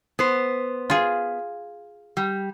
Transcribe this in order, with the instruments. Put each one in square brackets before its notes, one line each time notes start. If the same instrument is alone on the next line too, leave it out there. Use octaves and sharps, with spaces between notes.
[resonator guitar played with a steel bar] B3 C5
[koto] F4 G#4
[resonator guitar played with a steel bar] G3